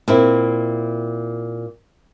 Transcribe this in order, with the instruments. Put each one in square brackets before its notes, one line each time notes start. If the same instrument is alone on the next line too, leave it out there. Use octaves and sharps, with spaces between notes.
[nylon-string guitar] A#2 C4 E4